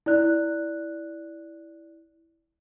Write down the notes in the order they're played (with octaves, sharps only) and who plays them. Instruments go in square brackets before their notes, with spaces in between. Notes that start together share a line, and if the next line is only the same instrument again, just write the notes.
[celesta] E4 D5 F#6